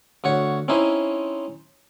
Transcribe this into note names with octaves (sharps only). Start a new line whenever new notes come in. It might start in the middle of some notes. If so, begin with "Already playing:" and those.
D2 F#4 C#5
C4 C#4 D#4 E4 C5